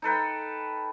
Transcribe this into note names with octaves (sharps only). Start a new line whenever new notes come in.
D#4 A4 B4 G5